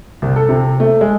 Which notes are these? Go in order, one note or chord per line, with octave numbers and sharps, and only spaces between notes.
C2
A4
C3
A3
G#3